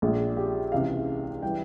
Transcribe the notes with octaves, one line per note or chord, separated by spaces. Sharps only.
A#1 A#2 G#3
G4
C#2 C3 E3 G#3 F5
E3 G3 G5